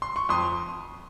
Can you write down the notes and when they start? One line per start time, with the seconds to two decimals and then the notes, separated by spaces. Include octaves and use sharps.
0.02 C6
0.16 C#6
0.29 F2 C6 D#6